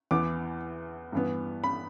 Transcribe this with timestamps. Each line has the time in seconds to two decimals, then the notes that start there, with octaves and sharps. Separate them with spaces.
0.11 E2 E3 B3 D6
1.12 G2 E3 B3
1.64 B5